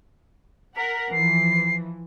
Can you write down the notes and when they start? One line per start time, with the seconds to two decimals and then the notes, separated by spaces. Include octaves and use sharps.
0.76 A#4 F#5 B6
1.12 E3 F3 C7